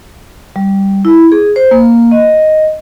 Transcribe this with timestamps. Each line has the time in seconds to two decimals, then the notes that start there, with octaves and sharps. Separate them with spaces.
0.56 G3
1.05 E4
1.32 G#4
1.56 C5
1.71 A#3
2.11 D#5